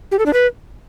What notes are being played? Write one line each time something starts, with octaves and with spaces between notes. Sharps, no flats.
G4
A4
D4
B4